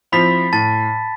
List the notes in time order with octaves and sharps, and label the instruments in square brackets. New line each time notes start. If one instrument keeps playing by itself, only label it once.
[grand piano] F3 C4 E4 [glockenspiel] B5 B6
[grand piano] A2 [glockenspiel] A5 A6